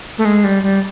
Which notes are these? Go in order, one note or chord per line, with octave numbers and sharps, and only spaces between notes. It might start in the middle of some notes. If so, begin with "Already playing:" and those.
A3
G#3
G3
G3